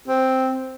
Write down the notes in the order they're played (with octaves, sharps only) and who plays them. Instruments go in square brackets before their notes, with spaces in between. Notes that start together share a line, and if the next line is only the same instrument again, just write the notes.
[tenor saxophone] C4